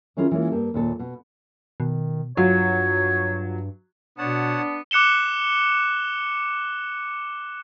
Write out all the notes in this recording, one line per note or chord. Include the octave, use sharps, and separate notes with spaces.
D#3 C#4 E4 F4 G#4 A#4
E3 G#3 A#3 C#4 F4
G2 A#3 G4 A4
D#2 A#2 A4
B2
B2 D#3
G2 F#3 F4 C#5
B2 B3 D4 C#5 F#5 A5
D6 F#6 C#7 E7 G7